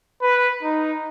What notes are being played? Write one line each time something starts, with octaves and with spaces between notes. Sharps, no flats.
B4
D#4